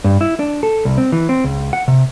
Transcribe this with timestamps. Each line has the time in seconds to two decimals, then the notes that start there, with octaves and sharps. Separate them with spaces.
0.04 G2
0.21 E4
0.39 D4
0.63 A4
0.85 C2
0.98 C4
1.12 E3
1.29 C4
1.44 C#2
1.73 F#5
1.88 C3